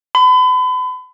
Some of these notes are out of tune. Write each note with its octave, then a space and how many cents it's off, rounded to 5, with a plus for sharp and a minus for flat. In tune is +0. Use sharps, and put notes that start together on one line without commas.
B5 +40